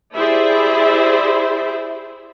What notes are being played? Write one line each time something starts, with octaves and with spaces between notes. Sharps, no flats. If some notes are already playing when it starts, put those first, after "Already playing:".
E4 G4 G#4 C5 D5 E5